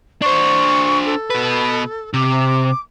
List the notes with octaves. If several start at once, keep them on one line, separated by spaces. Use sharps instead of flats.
D4 C5 C#6
A4
B2 B4
C3 D6